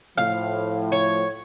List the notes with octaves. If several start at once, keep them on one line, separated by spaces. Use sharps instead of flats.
A2 F3 F5
C#5